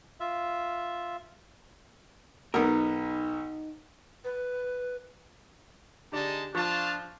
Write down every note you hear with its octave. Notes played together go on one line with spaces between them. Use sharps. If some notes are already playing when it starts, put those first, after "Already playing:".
F4 E5
B1 B3 D#4 A#4
B4
D3 G#3 D#4 G4 D5 A5
F3 D4 F4 F5 A5 C#6